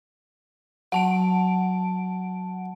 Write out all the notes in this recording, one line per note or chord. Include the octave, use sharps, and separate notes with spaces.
F#3 F#5 A5 D7